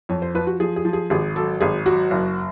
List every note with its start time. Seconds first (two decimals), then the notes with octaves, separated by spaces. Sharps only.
0.09 F2 C#5
0.22 C5
0.35 F3 B4
0.47 F#4
0.60 F3 G#4
0.76 G#4
0.85 F3
0.93 G#4
1.10 G#1 G#4
1.35 F#3 A4
1.60 G#1 G#4
1.86 F#3 F#4
2.11 F#1